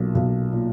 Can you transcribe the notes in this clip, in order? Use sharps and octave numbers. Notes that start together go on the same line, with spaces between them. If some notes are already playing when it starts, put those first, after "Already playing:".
Already playing: B1 A#2 A#3
B1
A#2